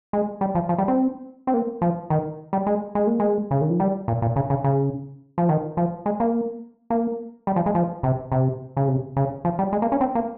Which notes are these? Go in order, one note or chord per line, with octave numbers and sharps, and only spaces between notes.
G#3
G3
F3
F3
G3
C4
C4
A#3
F3
D#3
G3
G#3
G#3
A#3
G#3
C#3
D#3
F3
G3
A#2
A#2
C#3
C#3
C#3
F3
D#3
F3
G#3
A#3
A#3
G3
F3
G#3
F3
C3
C3
C#3
C3
C#3
F3
G3
G#3
A#3
C#4
C4
A#3